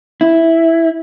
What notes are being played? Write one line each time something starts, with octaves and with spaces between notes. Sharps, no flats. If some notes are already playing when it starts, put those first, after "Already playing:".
E4